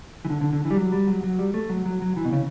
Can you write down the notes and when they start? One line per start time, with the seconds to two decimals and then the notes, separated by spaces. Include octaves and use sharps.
0.25 E3
0.30 D3
0.41 D3
0.53 D3
0.65 E3
0.71 G3
0.77 F#3
0.92 G3
1.07 F#3
1.23 F#3
1.39 G3
1.54 A3
1.69 F#3
1.86 F#3
2.02 F#3
2.16 E3
2.25 B2
2.32 C#3